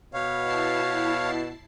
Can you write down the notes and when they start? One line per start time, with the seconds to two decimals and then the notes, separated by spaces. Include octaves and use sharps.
0.14 B2 C#5 F5
0.44 E4 A5 C7